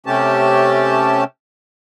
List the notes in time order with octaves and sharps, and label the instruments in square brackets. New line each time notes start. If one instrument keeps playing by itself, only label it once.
[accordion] C3 A3 C#4 G4 A5